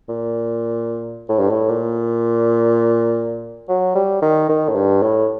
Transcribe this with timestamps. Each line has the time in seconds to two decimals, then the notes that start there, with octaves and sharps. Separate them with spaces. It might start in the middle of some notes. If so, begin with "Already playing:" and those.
0.09 A#2
1.29 A2
1.39 G2
1.50 A2
1.69 A#2
3.69 F#3
3.95 G3
4.22 D#3
4.49 D#3
4.69 A2
4.75 G2
5.02 A2